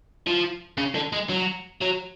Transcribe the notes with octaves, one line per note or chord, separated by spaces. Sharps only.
F3
C#3
D3
G#3
F#3
F#3